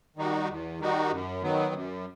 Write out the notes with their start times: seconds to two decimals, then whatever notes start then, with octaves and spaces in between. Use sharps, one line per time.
0.17 D#3 G3 D#4 F#4
0.48 E2
0.80 D#3 G3 D#4 F#4
1.11 F#2
1.42 D#3 F#3 B3
1.74 F#2